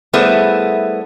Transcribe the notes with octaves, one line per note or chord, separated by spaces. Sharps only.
G3 A3 B3 E4 G#4 C5